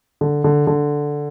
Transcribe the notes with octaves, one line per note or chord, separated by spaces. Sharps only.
D3
D3
D3